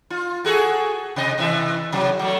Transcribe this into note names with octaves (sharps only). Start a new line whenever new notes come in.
F4
F#4 G#4 A4
C3 D#5
C3 E3 E5
C3 F#3
F#3 A3